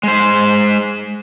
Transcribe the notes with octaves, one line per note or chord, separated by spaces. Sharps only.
G#3 C5